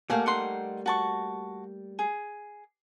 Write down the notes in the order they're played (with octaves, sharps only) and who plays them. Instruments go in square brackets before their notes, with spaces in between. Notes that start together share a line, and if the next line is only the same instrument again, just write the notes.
[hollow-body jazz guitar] G3 A3 A#3 [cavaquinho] F5 F#5 G#5
[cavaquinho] D#4 F#5 C6
F#4 A5 C#6
G#4